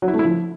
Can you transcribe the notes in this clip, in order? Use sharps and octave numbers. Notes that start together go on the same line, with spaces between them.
F#3
E4
A3
E4
F3